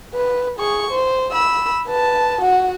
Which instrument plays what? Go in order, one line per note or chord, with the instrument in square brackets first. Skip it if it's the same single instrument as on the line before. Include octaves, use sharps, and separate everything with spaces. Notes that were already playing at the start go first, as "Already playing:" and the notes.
[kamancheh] B4
G#4 C#6
C5
B5 E6
B4 A5
F#4 F#5